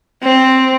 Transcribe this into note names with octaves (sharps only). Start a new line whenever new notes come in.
C4